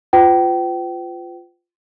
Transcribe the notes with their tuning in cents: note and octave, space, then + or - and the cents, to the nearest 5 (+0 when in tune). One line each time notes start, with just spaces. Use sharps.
F4 +0 B4 +45 G5 -35